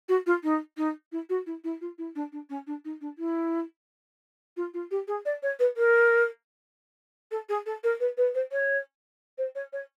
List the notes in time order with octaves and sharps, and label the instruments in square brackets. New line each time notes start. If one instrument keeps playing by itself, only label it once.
[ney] F#4
F4
D#4
D#4
E4
F#4
E4
E4
F4
E4
D4
D4
C#4
D4
D#4
D4
E4
F4
F4
G4
G#4
D5
C#5
B4
A#4
A4
G#4
A4
A#4
B4
B4
C5
C#5
C5
C#5
C#5